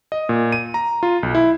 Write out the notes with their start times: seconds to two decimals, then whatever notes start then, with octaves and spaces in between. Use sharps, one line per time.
0.12 D#5
0.29 A#2
0.52 D#7
0.74 A#5
1.03 F4
1.23 B1
1.35 E4